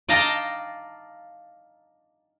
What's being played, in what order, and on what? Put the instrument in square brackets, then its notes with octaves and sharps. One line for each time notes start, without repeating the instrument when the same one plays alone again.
[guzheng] D5 D#5 F5 G5 A5 A#5